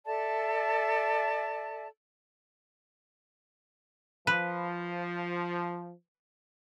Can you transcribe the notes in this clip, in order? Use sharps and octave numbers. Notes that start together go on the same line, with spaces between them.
A4 D5 E5 A5
F3 B4